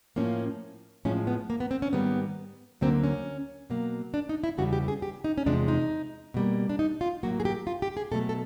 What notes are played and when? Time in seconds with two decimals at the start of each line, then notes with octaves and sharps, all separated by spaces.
0.16 A2 F3 A#3 C#4
1.05 A2 F3 G#3 C#4
1.27 B3
1.50 A#3
1.60 B3
1.71 C4
1.82 C#4
1.93 G#2 D#3 G3 A#3 B3
2.81 D2 D3 F#3 A#3 C4
3.04 C#4
3.70 B2 F#3 A#3
4.14 D4
4.29 D#4
4.44 E4
4.58 E2 C#3 E3 G3 F#4
4.73 G4
4.88 G#4
5.02 G4
5.24 D#4
5.38 C#4
5.46 E2 C3 F3 G#3 D4
5.68 D#4
6.34 B2 G3 A#3
6.69 D4
6.79 D#4
7.01 F4
7.23 A2 F#3 A#3 F#4
7.40 G#4
7.45 G4
7.67 F4
7.82 G4
7.97 G#4
8.12 B2 F#3 A3 A4
8.29 A4